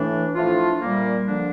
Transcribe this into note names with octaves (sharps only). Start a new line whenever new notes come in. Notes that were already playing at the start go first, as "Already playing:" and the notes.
Already playing: A2 E3 A3 D4
A2 F3 A3 D4 F4
A#2 G3 A#3
D3 F3 A#3 D4